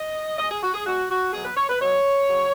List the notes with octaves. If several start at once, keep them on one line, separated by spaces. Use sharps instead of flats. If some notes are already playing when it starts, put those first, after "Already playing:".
Already playing: D#5
B2 G#3 D#5
G#4
F#4
G#4
B2 G#3 F#4
F#4
B2 F#3 G#4
B4
C#5
B4
B2 F#3 C#5
C#3 F#3